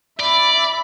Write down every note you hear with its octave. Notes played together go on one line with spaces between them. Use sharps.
D5 E5 B5